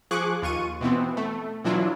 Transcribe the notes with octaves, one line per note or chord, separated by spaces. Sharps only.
F3 G#4 C#6 D6 F#6
D#2 F4 C#6 D#7
B2 E3 B3 C4
A3
B2 E3 F#3 D4 E4 F4